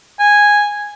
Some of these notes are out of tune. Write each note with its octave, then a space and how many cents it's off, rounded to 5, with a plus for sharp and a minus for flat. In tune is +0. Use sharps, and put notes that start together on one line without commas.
G#5 -5